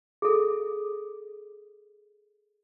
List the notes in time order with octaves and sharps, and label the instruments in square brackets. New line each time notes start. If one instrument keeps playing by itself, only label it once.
[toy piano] G#4 A4